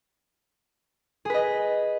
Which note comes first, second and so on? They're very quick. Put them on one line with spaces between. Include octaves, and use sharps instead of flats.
G#4 B4 D#5